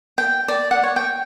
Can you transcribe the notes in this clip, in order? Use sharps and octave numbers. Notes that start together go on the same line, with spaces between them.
G5
D5
F#5
C#5
G5